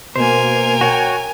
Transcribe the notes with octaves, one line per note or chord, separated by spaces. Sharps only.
B2 A#3 A#4 C5 G#5
F#4 C#5 G5